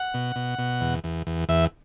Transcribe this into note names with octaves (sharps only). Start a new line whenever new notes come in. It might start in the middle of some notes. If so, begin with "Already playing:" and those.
Already playing: F#5
B2
B2
B2
E2
E2
E2
E2 E5